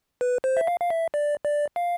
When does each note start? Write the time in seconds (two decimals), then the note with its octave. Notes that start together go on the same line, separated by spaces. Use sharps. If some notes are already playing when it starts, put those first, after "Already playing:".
0.21 B4
0.44 C5
0.57 E5
0.67 F5
0.80 F5
0.90 E5
1.14 D5
1.45 D5
1.76 F5